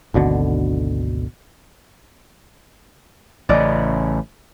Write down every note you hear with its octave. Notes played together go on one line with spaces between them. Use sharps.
G#1 D2 B2 D3
A1 C#3 D5 D#5